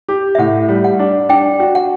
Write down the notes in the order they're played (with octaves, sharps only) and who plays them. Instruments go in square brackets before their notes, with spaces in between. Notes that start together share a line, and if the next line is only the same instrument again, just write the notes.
[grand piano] G4
[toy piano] E5
[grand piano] A2 [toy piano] F#5
[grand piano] G3
[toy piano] F#5
[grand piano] D4
[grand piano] D4 [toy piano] G5
[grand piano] F#4
[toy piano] F#5